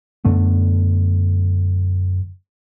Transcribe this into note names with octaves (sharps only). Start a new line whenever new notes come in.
F#2 D3 A3 B3